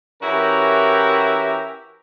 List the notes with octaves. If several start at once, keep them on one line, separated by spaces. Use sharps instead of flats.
E3 C#4 E4 F#4 G4 A#4